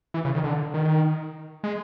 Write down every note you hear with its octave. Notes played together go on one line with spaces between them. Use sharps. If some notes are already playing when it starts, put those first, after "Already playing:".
E3
C#3
D#3
D3
D#3
G#3